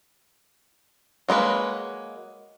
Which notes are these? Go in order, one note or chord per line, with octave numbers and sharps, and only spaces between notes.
F#3 G#3 A#3 B4